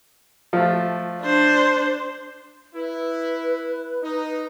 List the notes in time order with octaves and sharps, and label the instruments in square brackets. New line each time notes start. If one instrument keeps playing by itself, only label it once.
[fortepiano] F3 A3
[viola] D4 C5
[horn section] E4 [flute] B4
[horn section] D#4